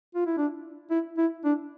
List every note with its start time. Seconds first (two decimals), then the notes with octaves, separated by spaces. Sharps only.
0.15 F4
0.26 E4
0.38 D4
0.91 E4
1.18 E4
1.45 D4